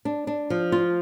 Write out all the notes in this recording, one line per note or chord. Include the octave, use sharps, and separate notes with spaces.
D4
D4
F3
F4